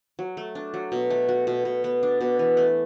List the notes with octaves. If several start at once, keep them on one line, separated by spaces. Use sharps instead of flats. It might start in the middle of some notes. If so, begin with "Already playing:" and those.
F#3
A3
D4
F#3
B2
A3
F#4
B2
B2
B3
D4
B2
E3
A3